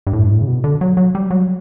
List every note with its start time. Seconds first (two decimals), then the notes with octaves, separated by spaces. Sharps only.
0.07 G2
0.13 A2
0.25 G2
0.31 A2
0.42 C#3
0.47 B2
0.64 D3
0.81 F#3
0.97 F#3
1.15 G3
1.31 F#3